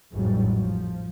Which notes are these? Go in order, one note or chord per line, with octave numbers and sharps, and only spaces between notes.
A1 F2 G#2 F#3 G3
F3